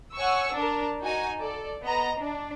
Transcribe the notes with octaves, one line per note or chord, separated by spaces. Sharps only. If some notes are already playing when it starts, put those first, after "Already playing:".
C#5 F#5 G#5 C#6 E6
D4 A#4 A5
D#4 F#4 G#5
A4 D5
B3 D#5 A#5
D4